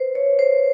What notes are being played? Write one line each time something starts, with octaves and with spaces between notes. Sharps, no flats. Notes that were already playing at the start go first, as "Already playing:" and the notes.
Already playing: B4 C5
C#5
C5